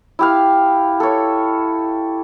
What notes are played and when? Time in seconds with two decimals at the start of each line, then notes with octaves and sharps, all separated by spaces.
0.19 E4 G4 F5
1.00 A4 C#5